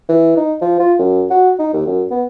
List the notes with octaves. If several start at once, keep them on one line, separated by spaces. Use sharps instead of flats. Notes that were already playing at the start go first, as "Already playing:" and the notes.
E3
D#4
F3
F4
F#2
F#4
D#4
D#2
F#2
B3